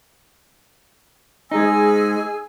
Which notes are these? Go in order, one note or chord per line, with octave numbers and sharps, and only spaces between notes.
G#3 D#4 G#4 G#5 E6